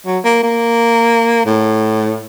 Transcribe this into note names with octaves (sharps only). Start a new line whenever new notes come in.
F#3
A#3
A#3
A2